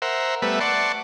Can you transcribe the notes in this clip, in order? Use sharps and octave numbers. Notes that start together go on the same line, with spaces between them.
A#4 C5 E5 F#5
G3 A3 B3 B4 E5
D5 F#5 A5 C6 C#6